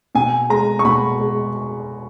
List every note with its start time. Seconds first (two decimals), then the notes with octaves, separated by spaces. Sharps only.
0.15 B2 G#5
0.49 G#3 A#5
0.79 C#6
0.85 B2 B5
1.20 G#3